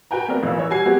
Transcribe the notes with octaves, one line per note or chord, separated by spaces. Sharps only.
F#4 B4 G5 G#5 A#5
A3 B3 C4 A#4 D5
A1 E2 F4 E6
E3 C#5
G3 F#4 G#5 G#6 C7
F#3 G#3 B3 C4 F#4 G4